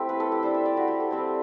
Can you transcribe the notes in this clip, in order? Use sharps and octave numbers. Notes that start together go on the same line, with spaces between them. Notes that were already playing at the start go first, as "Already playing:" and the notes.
Already playing: A3 C4 E4 G4
B4
A4
G4
G3 D4 C5
E5
D5
F#4
G4
A4
G3 C4 E4 C5